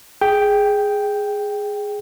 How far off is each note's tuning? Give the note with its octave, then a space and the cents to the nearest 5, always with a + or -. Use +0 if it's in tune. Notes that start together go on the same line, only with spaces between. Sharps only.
G#4 +0 G5 +0